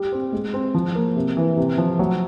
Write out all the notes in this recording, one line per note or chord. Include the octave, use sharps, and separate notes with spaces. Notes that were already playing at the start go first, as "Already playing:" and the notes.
Already playing: G3
C4
G#3
C4
F3
A#3
C3
E3
C3
F3
F#3